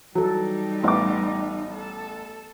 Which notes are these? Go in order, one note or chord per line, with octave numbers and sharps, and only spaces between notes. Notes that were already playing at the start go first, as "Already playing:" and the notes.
E3 F#3 G3 D#4 A4
A1 B3 F4 D6
A4